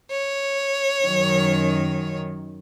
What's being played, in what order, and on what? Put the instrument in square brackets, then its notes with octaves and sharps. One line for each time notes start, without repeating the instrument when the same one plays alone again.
[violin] C#5
[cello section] F#2 D#3